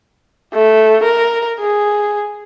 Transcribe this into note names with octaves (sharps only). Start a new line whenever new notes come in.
A3
A#4
G#4